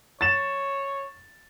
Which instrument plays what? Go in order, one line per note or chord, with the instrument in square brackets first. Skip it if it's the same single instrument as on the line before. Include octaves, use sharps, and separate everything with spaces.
[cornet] C#5 [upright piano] A6 E7